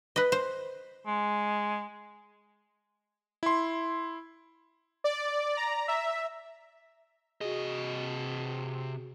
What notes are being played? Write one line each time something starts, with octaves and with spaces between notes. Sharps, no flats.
B4 D#5
C5
G#3
E4 C6
D5
A#5
E5
C3 F#4 G#4 D#5